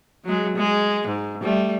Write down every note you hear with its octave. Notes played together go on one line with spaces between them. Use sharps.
F#3 G#3
G#3
G#2
G3 A3